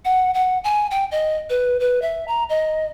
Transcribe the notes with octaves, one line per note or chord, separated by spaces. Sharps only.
F#5
F#5
G#5
G5
D#5
B4
B4
E5
A#5
D#5